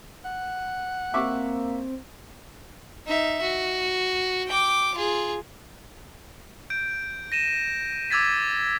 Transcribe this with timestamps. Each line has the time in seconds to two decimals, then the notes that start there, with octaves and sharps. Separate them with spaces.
0.25 F#5
1.14 A#3 C4 E5 C#6 D6
3.07 D#4 E5
3.42 F#4
4.48 G5 D6
4.95 F4 G#4
6.70 G6 D7
7.32 A#6 D#7 E7
8.10 D6 E6 G#6 A6 B6